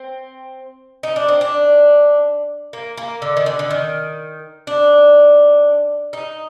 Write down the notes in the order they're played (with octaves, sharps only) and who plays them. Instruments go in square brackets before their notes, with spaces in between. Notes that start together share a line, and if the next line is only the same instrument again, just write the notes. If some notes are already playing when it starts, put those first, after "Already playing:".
Already playing: [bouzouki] C4
D#4
D4
C4
D4
A#3
A#3
D3
D#3
D3
D3
D#3
D4
D#4